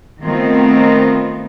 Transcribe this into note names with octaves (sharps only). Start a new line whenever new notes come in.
D#3 A3 B3 C4 F4